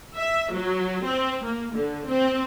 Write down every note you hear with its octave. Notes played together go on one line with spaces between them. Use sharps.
E5
F#3
C4
A#3
D3
C4